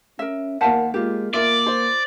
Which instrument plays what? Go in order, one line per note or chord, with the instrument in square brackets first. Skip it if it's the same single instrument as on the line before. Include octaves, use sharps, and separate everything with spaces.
[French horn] C#4 [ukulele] A#4 E5
[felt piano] D#2 F5 B6 [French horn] A#4 [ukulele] C5 F#5 A5
[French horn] G#3 [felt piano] A#3 F4 [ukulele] G4
[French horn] A#3 [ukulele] F4 [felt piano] A#4 E5 [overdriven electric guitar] D5
[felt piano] C5